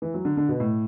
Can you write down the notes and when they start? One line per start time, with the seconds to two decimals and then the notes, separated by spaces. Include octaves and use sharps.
0.02 E3
0.14 F#3
0.25 D3
0.37 D3
0.49 B2
0.60 A2